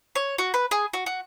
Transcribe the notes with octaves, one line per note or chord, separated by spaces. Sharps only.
C#5
F#4
B4
G#4
F#4
F#4